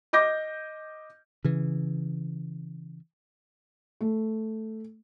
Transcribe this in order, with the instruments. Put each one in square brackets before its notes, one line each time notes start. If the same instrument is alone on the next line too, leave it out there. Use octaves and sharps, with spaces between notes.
[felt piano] D#5 D6 G6 A#6
[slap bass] C#3 E3
[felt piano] A3